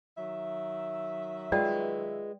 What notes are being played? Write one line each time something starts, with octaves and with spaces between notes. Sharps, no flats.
D#3 F#3 E5
G#3 F4 B4 D5 G5